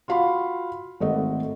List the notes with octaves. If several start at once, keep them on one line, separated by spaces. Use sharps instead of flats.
F4 F#4 F5 B5 C6
G#1 A3 D#5 F#5